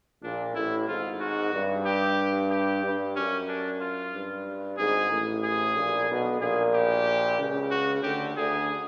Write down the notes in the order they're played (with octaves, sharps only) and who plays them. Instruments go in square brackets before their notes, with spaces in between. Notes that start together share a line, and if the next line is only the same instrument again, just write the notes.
[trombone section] A#1 A#2 [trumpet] D4
[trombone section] A1 A2 [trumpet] E4
[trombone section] G#1 G#2 [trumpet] F4
[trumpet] F#4
[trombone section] G2
[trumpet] G4
G4
[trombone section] G2
[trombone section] F#2 [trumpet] C#4
[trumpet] D4
F4
[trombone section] G2
[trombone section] G#1 G#2 [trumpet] G#4
[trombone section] A1 A2
[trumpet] G#4
[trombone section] A#1 A#2
B1 B2
[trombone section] A#1 A#2 [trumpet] G#4
[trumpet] G4
[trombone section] C#2 C#3
[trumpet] F#4
[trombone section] D2 D3 [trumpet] G4
[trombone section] D2 D3 [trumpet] G#4